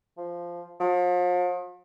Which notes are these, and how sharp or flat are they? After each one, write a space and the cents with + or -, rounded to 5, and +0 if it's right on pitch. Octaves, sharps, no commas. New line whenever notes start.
F3 -5
F3 +40